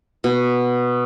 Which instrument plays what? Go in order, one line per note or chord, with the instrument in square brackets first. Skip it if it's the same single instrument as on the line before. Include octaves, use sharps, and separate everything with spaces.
[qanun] B2